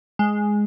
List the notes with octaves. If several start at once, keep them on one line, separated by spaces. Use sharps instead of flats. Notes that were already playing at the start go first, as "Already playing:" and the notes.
G#3